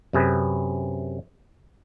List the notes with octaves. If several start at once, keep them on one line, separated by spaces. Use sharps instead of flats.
F#2 C3 G#4 B4